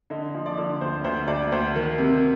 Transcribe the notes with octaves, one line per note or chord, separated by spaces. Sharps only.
D3 D#5
F3
D5
D3
D2 C5
D2 C5
D2 D5
D2 C5
D#3
C3